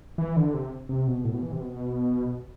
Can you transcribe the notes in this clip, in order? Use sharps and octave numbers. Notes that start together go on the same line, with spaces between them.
E3
D3
C3
C3
B2
A2
B2
E3
C3
B2